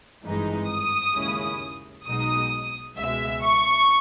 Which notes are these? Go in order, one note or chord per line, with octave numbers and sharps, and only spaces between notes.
G#1 G2 E3 G#3 D#4
D#6
D#2 C#3 G#3 C#4 E4
B1 B2 G#3 D#4 D#6
C#2 B2 G#3 E5
C#6